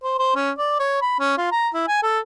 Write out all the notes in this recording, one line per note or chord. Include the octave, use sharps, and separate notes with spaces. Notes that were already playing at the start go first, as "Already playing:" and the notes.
C5
C5
C#4
D5
C#5
B5
C#4
F4
A#5
E4
G#5
A4